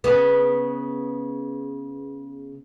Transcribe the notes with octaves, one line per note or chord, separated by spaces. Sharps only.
C#3 B3